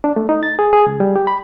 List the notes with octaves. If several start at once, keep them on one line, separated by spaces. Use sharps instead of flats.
D4
A3
D#4
A6
G#4
G#4
C#2
G3
G4
B5